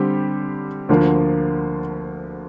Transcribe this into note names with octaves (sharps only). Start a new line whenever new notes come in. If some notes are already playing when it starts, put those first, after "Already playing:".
Already playing: D3 G3 C4 G4
D2 D3 F3 A#3